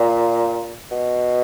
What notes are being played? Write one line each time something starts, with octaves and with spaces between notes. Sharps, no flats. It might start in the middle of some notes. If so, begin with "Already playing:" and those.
Already playing: A#2
B2